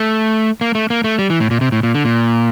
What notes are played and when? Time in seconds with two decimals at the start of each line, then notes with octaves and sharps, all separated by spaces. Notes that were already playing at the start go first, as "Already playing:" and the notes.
Already playing: A3
0.61 A#3
0.75 A3
0.90 A#3
1.04 A3
1.19 G3
1.30 E3
1.40 A2
1.51 A#2
1.61 C3
1.72 A2
1.83 A#2
1.94 D3
2.05 A#2